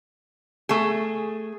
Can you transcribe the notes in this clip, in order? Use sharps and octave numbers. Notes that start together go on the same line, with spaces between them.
A3 G#4